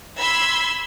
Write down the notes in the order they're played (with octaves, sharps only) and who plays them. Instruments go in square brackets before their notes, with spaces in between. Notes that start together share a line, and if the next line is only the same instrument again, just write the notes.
[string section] B5 C6 E6 G#6